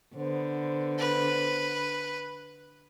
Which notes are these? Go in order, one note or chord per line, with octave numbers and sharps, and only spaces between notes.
D3 B3 C5
B4